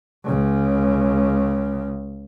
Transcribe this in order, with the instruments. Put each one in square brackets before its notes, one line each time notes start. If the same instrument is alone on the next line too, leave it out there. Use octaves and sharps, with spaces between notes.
[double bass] C#2 C#3